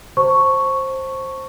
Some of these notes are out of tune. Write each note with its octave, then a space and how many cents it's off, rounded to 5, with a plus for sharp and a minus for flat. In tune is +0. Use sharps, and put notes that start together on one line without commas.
C5 +15 A5 +25 C#6 +0